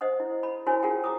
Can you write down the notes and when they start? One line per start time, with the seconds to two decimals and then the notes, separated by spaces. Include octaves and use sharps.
0.01 C5 D#5 F#5 D#6
0.20 E4
0.43 B5
0.66 E4 F#4 A#4 C5 C#5 G#5
0.83 F4 G#4 A#4 F#5 G5
1.04 A#5 D6 D#6